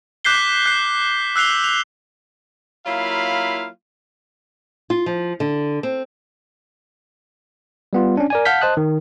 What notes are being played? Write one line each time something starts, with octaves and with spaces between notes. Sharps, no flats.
D6 F#6 G6 B6 C7 G7
F#6 C7
E6 F#6 C7 F7 G7
F7
F#3 A#3 E4 F4 F5 B5
F4
F3
D3
C4
G3 B3 F4
C#4 D4
A#4 D5 G#5
F5 F#5 A5 F6 G6 B6
C5 D#5 A5 D#6 F#6
D#3